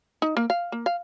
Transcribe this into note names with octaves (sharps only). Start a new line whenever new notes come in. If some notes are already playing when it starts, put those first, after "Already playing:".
D#4
A#3
F5
A#3
F5